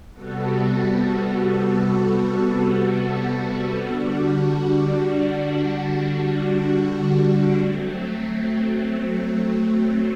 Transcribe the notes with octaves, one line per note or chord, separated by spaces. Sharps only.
C3 G3 B3 F#4 A4
D3 G3 D4 F#4
F#3 A3 C4